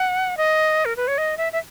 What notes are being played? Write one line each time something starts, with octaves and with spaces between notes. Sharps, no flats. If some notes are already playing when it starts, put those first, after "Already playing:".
Already playing: F#5
D#5
A#4
B4
C#5
D#5
E5
E5